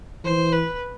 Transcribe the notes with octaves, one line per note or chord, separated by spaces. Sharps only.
E3 C5
B4